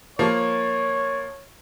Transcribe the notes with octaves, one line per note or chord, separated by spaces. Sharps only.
F3 A#3 C#5